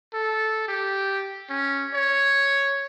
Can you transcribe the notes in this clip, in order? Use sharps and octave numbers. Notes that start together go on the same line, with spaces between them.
A4
G4
C#4
C#5